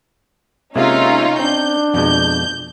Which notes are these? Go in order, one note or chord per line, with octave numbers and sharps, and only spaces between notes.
C3 G#3 A#3 C#4 D#4 F4 E5
C4 D4 G6
F2 B2 G#3 G6